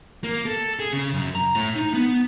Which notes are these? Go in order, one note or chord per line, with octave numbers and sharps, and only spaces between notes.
A#3
A4
G#4
C#3
F#2
A#5
A2
D#4
B3